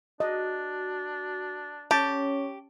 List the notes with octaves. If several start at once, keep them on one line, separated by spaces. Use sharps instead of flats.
D4 F#4 D#5
C#4 G4 C#5 A5